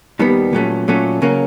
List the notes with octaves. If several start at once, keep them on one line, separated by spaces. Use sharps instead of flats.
D#2 D#3 G3 B3
A#2 F#3 A3 C#4
A#2 F#3 A3 C#4
C#3 F#3 A#3 C#4